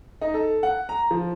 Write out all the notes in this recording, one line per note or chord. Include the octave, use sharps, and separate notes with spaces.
D#4
A4
F#5
A#5
F3